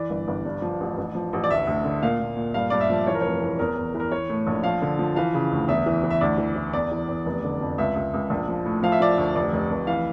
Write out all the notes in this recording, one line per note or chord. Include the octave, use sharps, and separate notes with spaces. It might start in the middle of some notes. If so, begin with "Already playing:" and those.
Already playing: E3 D5
G1
G1
G2
F3
A1
A1
F3
A1
D5
D2 E5
D2
D3
A#2 F5
A#2
A#2
G2 F5
G2 D5
E5
F3
E3 C#5
A#4
F1 C#5
E3
E2 A#4
E2
E3
A#4
E3 C#5
A2
A#1
F3 F5
D3
F3
E3 F5
C#3
D2
E2 E5
E3
E3
E5
D2 D5
E3
E3
E2 D5
E3
E2
F1
D3
F2
C#2 E5
C#2
C#2
A#1
F3
A2
F3 F5
E5
F3 D5
E5
D2
F1 D5
F1
F1
E3 F5